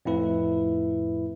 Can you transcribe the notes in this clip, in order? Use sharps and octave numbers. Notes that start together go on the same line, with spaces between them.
F2 A2 E4 B4